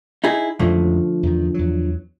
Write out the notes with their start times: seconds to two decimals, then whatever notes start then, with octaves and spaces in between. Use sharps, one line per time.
0.24 D#4 E4 G#4
0.59 A1 F2 D3 F3 G#3 A3
1.23 E2 D#3
1.54 E2 F#3